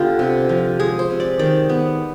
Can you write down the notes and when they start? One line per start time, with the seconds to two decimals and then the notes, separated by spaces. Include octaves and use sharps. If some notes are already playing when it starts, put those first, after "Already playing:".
Already playing: D3 B3 F4 G4
0.19 C3
0.49 F3
0.79 G#3 G#4
0.99 C5
1.10 C3
1.20 D5
1.39 D#3 D5
1.69 B3